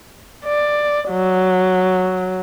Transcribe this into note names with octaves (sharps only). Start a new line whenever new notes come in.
D5
F#3